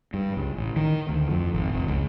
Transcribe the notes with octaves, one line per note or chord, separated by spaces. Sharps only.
G2
C#2
A1
D#3
D2
F2
G#1
F1
C#2